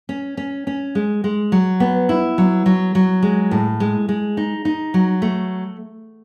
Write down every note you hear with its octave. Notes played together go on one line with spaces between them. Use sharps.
C#4
C#4
C#4
G#3
G#3
F#3
B3
E4
F#3
F#3
F#3
G#3
A2
G#3
G#3
D#4
D#4
F#3
A3